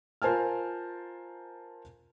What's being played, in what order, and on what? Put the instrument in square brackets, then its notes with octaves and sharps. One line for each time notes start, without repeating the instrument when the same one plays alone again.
[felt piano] F4 A#4 C5 G#5 A5 F6